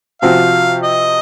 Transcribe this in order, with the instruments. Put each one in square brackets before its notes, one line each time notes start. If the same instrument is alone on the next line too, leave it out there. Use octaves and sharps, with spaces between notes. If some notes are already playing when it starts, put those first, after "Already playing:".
[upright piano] C3 F3 C4 F#4 [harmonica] F5
[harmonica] D#5